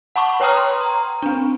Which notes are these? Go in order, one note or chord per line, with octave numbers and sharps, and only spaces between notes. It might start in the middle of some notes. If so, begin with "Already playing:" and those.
F#5 A5 B5 C#6 D6
B4 C#5 G5 A#5 D#6 F6
C6
A#5
C4 D4